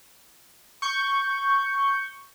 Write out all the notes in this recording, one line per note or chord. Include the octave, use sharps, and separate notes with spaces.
C#6 G6